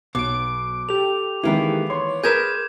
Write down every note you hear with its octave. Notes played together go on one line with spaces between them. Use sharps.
B1 B2 D6 D7
G4 A4 F7
D#3 E3 G#3 A#3 B3 E4
C#5 C6
G#4 A#4 B4 G6 G#6 E7